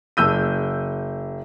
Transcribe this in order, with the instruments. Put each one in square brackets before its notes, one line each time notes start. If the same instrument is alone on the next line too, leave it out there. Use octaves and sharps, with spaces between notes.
[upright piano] F#1 E6 G6 D#7